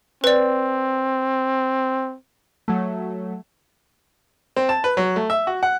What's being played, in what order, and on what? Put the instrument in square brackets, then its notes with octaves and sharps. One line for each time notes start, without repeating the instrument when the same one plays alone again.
[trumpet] C4 [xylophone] B4 D5
[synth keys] F#3 A3
[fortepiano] C4
A5
B4
F#3
A3
E5
F#4
F#5